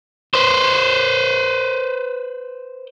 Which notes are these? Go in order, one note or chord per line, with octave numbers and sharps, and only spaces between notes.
B4 C5